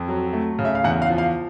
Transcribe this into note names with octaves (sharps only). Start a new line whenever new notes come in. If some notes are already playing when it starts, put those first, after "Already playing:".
Already playing: F2
F#3
A3
C#3
E5
F5
E2 F#5
F5
F3
F5